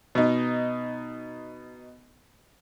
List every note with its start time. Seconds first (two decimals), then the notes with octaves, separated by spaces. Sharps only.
0.15 B2 D#4